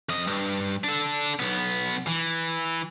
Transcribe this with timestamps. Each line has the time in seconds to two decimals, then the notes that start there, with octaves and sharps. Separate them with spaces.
0.09 F2 D#5
0.27 G2
0.84 D4 A4
1.39 B1 B3
2.07 E3